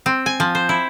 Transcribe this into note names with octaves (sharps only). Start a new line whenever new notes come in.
C4
G#5
F3
C5
E4